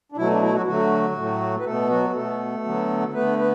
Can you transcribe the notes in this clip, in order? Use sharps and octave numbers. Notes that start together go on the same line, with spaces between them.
D4
B2 F#3 A3 E4
D4
E4
F#3 F#4
D3 F#3 A3 F#4
A2 F#3 A3
B4
B2 A3 B3 A4
F#3 F#4
B2 A3 B3 A4
D3 F#3 B3
D3 A3 B3 B4
B3 B4